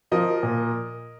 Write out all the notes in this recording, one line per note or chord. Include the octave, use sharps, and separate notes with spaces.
F3 A#4 D#5
A#2